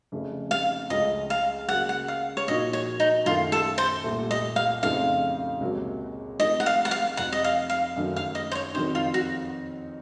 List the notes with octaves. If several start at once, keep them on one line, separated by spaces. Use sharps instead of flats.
F1 F2 C#3 A3
F5
C#2 C#3 F3 A3 C#4 D#5
F5
C#3 F#3 A#3 F#5
F#5
F5
C#5
A#2 F3 A#3 D#4 F#4 D#5
C#5
D#4
F#2 D#3 A3 F4
A4
C5
C2 A#2 A3
D#5
F5
F2 C#3 A3 C4 D#4 F5
C#2 C3 F#3 A#3
A2 F3 C4 D#4 A#4 D#5
F#5
F5
F#5
F5
F1 F2 C3 F#5
D#5
F5
F5
F#2 D#3 F#3 A3 D#4
F5
D#5
C5
C#5
F2 D#3 F#3 C4 D#4 C5
F4
F#4